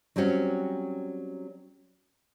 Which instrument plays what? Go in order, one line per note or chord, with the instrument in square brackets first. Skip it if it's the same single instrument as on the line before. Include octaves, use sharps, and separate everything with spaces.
[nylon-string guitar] F#3 G3 C4 C#4 F#4